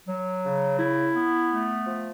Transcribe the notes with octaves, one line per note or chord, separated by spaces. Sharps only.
F#3
C#3
E4
B3
A3
F3